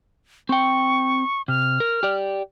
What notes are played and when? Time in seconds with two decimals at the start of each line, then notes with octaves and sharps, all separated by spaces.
0.49 C4 G5 C#6
1.48 C3 F6
1.80 A#4
2.03 G4 D5